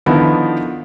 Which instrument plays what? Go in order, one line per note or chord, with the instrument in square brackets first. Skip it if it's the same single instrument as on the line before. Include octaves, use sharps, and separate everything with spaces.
[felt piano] D3 D#3 F3 B3 E4